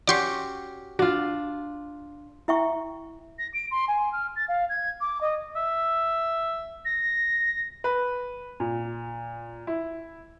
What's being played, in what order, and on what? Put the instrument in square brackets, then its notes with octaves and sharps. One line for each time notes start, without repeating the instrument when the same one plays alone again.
[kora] C#4 F#4 G4 [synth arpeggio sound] D5 C6 C#6
[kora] D4 F4 [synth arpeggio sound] F#4
[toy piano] E4 E5 G5 C#6
[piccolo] A#6
D7
C6
G#5
F6
A6
F5
G#6
D6
D#5
[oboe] E5
[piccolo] A#6
[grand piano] B4
A#2
E4